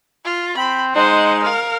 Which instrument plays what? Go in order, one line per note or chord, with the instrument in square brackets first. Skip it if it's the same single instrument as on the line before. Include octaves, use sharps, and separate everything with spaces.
[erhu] F4
[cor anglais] C4 [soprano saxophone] G5 [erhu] B5
[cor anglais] G#3 [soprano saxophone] D#4 [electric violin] C5 [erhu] F#5
[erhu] A#4 [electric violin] F5